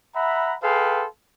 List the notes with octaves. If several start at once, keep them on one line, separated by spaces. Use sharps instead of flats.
E5 F#5 A#5 B5
G#4 A4 B4 F5 G5 C6